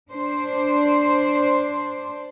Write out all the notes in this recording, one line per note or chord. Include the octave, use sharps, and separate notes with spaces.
D4 C5